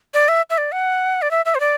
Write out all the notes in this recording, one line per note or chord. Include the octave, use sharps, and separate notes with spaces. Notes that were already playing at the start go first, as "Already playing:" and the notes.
D5
E5
E5
D5
F#5
D5
E5
E5
C5
D5